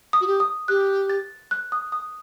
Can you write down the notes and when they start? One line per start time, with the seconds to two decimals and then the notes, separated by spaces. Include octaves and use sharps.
0.13 D#6
0.21 F#4
0.27 G4
0.40 D#6
0.68 G4 F#6
1.10 A6
1.51 F#6
1.72 D#6
1.92 D#6